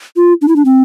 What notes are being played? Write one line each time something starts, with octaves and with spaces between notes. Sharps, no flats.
F4
D4
E4
D4
C4